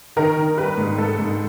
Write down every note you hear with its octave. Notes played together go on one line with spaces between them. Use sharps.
D#3 A#4
D#3
G3 B4
G#2
G#2 A4
G#2